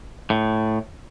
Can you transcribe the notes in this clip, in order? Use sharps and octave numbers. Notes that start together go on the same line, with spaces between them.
A2